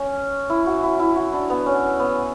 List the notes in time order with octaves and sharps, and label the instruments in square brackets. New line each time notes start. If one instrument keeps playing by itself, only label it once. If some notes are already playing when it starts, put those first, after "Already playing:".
Already playing: [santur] C#4
E4
F#4
E4
E4
F#4
D4
B3
C#4
B3